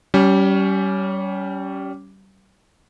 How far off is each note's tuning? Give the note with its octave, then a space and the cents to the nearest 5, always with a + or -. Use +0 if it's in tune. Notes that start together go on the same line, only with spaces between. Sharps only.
G3 -25 C#4 +15